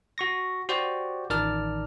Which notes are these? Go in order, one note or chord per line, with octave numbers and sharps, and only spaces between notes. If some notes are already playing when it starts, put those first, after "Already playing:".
F#4 C#6 A#6
F#4 G4 C5 D5
A1 D#3 A#4 D5 A5 F6